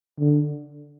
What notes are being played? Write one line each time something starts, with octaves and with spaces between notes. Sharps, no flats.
D3